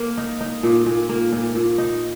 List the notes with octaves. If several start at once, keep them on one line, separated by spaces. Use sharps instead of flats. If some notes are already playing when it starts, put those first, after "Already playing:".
Already playing: A#3
D#4
D#4
A#2
A#2
A#3
A#2
A#2
D#4